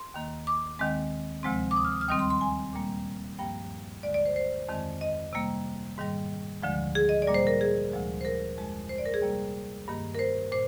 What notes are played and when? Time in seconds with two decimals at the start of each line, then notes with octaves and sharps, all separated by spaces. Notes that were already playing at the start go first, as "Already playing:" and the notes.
Already playing: C6
0.14 D#2 D#3 A#3
0.47 D6
0.79 D#2 D#3 G#3 C4
1.43 D2 C3 F3 G#3 C4
1.71 D6
1.76 D#6
1.85 F6
1.92 D#6
2.01 F6
2.08 D#2 D#3 G3 C4 D#6
2.19 C6
2.30 C6
2.41 G#5
2.73 A#2 G3 A#3
3.39 G2 F3 A#3 G5
4.03 D2 D3 G#3 D5
4.14 D5
4.26 C5
4.36 C5
4.69 F2 D#3 G#3 C4
5.01 D#5
5.33 C3 G3 A#3
5.98 G#2 D#3 G3
6.63 D2 D3 F3 G#3
6.95 G#4
7.09 D#5
7.22 D5
7.27 A#2 G3 A#3
7.34 C5
7.47 A#4
7.61 G#4
7.92 D2 C3 F3 G#3
8.21 C5
8.25 A#4
8.57 F2 D#3 G#3
8.89 C5
8.98 D5
9.06 A#4
9.14 G#4
9.22 C3 G3 A#3
9.88 G2 D#3 A#3
10.15 A#4
10.19 C5
10.52 A#2 C5